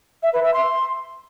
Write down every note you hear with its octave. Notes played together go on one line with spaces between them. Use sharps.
E5
B4
E5
C6